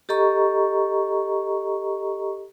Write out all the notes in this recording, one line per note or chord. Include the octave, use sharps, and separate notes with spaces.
G4 A4 D#5 A#5 C#6